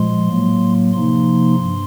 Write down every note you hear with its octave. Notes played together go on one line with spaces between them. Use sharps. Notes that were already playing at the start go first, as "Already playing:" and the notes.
Already playing: A#2 F3 G#3 C6
A2 F#3 A#3
C3 F3 A#3 D#4 C6
G2